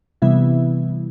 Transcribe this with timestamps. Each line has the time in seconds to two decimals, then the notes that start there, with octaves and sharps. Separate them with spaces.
0.22 C3 E3 G3 B3 E4 E5